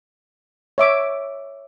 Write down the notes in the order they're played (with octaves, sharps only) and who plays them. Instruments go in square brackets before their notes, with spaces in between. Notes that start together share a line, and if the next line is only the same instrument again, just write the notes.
[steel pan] C#5 E5 D6